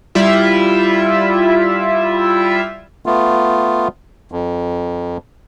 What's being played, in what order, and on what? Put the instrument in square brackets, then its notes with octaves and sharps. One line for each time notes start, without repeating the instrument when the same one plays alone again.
[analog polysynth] G3 E4 F4 E5
[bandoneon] A3 B3 F4
F2